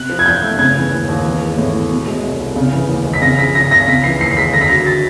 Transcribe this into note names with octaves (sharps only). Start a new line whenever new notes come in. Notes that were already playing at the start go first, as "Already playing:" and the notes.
Already playing: C3 F#6
F3
G#6
E2 G6
A3
C#3 G#6
E3
D#2
D#2
E3
G#3
A2
A2
B2
G#3
C2
C2
C#3
E3
D#2
G#3
B6
C#3 A#6
F3 B6
C#2 A#6
C#2 A#6
C#3 B6
E3 C7
D#2 C7
C7
G#3 B6
D3 A#6
B6
F#3 A#6
A6